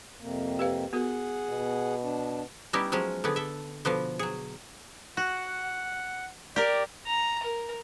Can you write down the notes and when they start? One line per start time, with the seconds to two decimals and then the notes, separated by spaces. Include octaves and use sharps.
0.20 F2 C3 A#3
0.59 G4 B4 F5
0.93 B3 F#4 G#4 A#4 F#5
1.49 B2
2.04 D4
2.73 G3 B3 C#4 D#4 E4 G4
2.92 F3 F#3 G#3 C#4
3.24 D3 B3 G#4
3.36 A4 E5
3.85 B2 D3 F3 B3
4.19 F#3 G#4
5.17 F#4 F#5
6.56 G4 A#4 D5
7.07 A#5
7.43 A#4